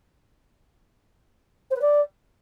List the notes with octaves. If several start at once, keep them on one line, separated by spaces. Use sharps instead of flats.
C5
B4
D5